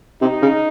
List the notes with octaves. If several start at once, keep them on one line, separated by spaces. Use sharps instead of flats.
C3 D#4
C#3